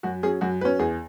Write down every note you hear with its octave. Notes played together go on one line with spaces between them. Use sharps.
F#2 F#4
F#3 C#4 G#4
F#2 F#4
F#3 C#4 B4
E2 G#4